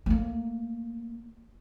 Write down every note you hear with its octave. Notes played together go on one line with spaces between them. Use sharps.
A3 A#3